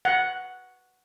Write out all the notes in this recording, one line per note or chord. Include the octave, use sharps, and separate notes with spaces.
F#5